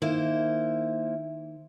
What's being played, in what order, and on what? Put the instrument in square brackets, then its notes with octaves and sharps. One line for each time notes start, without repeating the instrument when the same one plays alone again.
[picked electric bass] D#3 [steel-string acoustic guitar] A#3 E4 C5